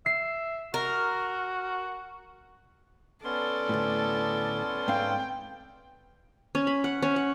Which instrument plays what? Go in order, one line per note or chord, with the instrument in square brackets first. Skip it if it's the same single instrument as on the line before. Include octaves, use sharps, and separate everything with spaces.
[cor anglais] E5 [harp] C7
[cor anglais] F#4 [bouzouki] A#4
[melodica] B3 C#4 C6 [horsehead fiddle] A4 D5
[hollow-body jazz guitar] D2 A2
[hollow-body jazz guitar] G#2 C4 F5 [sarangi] G5
[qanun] C#4
B5
F#5
C#4
F#5